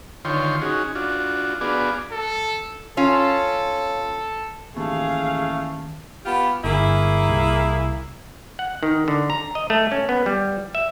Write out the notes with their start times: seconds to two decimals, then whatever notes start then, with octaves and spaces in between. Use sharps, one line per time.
0.25 D3 D#3 F4 C#5 G5 C6
0.62 C#4 D#4 F#4 G#4
0.95 D4 F4 F#4
1.61 B3 D4 F#4 G#4 D5 F5
2.12 A4
2.97 C#4 F4 A4
4.77 A1 D#2 A3 G#4 F5
6.25 B3 F4 G4
6.64 G1 A#3 E4 G#4
7.29 C2
8.59 F#5
8.83 D#3
9.08 D3
9.30 A#5
9.55 D#5
9.70 A3
9.92 C#4
10.09 B3
10.26 G3
10.75 E5